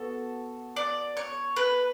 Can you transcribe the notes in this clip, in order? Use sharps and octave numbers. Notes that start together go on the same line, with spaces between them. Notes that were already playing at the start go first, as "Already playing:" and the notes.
Already playing: B3 F#4 A4
D5
C#5
B4